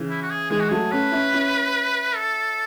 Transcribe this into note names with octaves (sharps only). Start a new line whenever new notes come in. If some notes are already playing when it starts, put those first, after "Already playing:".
Already playing: C#3 E3
E4
F#4
G#4
E3 G#3 G#4
F#4
F#3 A3 G#4
A3 C#4 B4
C#4 E4
C#4 E4
A4